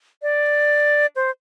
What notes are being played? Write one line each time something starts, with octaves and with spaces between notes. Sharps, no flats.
D5
C5